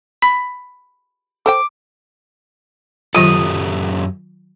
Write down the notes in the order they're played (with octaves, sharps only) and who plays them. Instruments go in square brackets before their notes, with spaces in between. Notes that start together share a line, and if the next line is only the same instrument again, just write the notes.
[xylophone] B5 B6
[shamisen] A4 C5 G5 [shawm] D6
[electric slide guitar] F#2 G4 A4 [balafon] D#3 F#3 F4 [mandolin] D#6